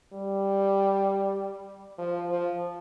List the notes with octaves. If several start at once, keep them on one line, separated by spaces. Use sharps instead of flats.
G3
F3
F3